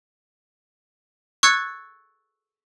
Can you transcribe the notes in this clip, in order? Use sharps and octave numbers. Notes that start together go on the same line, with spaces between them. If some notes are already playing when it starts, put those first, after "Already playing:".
C#6 E6 F#6 G#6 A6 C#7